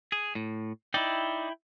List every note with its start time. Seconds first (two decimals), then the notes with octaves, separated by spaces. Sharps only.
0.12 G#4
0.35 A2
0.94 D#4 E4 D5 G5